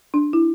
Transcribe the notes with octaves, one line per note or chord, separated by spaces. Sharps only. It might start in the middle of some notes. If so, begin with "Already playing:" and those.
D4
E4